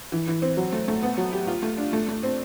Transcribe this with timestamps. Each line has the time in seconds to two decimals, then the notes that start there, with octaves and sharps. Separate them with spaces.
0.12 E3
0.27 E3
0.42 C4
0.57 F#3
0.72 A3
0.88 A3
1.03 B3
1.18 F#3
1.32 G4
1.47 F4
1.63 A3
1.77 D4
1.93 A3
2.08 A3
2.23 C4